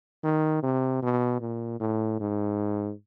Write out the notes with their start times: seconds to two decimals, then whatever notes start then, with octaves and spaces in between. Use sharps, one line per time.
0.24 D#3
0.63 C3
1.02 B2
1.41 A#2
1.80 A2
2.20 G#2